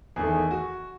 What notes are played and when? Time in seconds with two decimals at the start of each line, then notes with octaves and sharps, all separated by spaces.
0.16 E2 D#3 A3 G#4
0.51 F#4